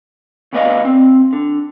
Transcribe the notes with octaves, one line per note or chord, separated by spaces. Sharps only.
D2 B2 B3 D5 D#5 F5
C4
D3